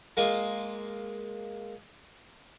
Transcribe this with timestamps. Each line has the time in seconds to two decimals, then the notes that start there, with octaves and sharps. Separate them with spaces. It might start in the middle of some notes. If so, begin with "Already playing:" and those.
0.17 G#3 A#3 F4